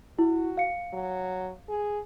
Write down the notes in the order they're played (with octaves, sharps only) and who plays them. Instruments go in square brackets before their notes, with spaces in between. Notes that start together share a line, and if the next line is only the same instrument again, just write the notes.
[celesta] E4 [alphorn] F#4
[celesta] F5 C#7
[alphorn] F#3
G#4